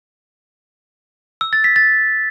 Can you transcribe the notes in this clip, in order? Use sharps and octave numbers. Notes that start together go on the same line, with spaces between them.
E6
A6
B6
A6